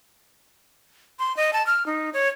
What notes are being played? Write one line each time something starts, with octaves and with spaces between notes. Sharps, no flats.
C6
D#5
A5
F6
D#4
C#5